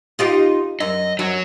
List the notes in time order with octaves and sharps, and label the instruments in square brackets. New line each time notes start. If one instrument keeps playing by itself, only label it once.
[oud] D#4 F4 G4
[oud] F#2 [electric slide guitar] D#5
[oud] F#2 [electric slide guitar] F#3